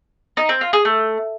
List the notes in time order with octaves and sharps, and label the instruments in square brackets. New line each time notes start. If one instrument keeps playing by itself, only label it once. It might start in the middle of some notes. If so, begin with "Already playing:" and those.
[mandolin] D#4
C4
F4
G#4
A3